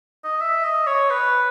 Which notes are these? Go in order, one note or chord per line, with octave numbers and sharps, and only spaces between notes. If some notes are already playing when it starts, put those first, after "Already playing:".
D#5
E5
D#5
C#5
B4